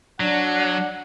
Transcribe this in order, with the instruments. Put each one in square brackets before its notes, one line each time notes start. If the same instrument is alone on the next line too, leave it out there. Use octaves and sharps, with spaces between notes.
[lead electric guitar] F#3 [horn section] D4 F#5